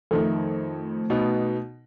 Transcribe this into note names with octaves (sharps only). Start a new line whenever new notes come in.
F2 D#3 A3
B2 B3 D#4